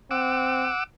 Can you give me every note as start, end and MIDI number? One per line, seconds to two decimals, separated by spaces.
0.11 0.71 60
0.11 0.84 78
0.11 0.84 86
0.11 0.84 88